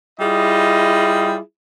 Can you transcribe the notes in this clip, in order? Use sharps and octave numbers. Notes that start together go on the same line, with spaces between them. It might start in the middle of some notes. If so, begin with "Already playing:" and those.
G3 E4 F4 G#4 D#5